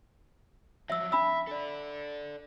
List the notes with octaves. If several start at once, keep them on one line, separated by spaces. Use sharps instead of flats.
F3 F#3 E5 E6
D4 E5 B5 E6
A4 D5